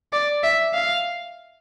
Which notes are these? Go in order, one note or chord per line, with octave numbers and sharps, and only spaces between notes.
D5
E5
F5